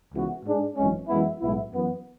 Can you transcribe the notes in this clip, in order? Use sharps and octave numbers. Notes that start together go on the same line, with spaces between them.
C#2 C#3 E3 B3 F#4
G#2 G#3 D4 G#4
G#1 F#2 E3 G#3 C#4
F#2 E3 G#3 B3 E4
B1 A2 G#3 B3 E4
F#2 E3 B3